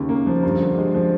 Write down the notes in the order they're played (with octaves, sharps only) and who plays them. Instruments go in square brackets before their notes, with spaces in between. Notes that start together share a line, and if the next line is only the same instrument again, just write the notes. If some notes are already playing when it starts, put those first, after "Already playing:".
Already playing: [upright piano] D#2 C#3
A#3
F3
G2
D3
G#3
F3